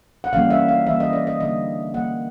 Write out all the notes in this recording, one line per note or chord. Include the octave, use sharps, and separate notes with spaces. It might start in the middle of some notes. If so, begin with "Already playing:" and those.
F#5
C#3 E3 G3 A#3 F5
E5
F5
C#3 E3 G3 A#3 E5
D#5
D5
D#5
D3 G3 A#3 D#5
D3 G3 A#3 F#5